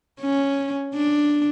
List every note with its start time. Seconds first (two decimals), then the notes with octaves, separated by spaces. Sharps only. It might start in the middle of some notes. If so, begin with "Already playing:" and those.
0.20 C#4
0.94 D4